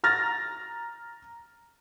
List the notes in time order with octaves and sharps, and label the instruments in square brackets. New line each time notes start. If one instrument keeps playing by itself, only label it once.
[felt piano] A#5 F6 A6 A#6